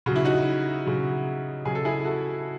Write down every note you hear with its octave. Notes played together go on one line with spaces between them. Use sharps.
C#3 F#3 F#4
E4
D#4 F#4
C#3 F#3
C#3 F#3 G#4
A4
E4 G#4
F#4 A4